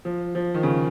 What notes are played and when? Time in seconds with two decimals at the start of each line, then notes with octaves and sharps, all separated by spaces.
0.05 F3
0.35 F3
0.54 D#3
0.63 C#3